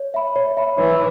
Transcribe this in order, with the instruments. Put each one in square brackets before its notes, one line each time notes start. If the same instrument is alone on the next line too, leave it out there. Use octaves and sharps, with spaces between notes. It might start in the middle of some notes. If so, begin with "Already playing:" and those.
Already playing: [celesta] C#5
E5 B5
C#5
E5 B5
[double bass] E3 [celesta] C#5